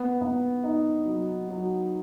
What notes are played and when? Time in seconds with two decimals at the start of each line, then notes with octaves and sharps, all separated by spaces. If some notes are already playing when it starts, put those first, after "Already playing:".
Already playing: B3
0.21 B3
0.64 D#4
1.06 F#3
1.49 F#3